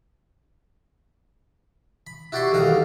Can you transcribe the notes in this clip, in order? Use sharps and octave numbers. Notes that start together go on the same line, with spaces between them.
B5
E4 F#4 G4 D5 C6 C#6
B1 E2 D#3 G3 F5 A#5